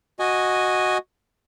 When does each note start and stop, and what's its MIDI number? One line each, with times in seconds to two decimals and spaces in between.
0.19 0.98 66
0.19 0.98 75
0.19 0.98 80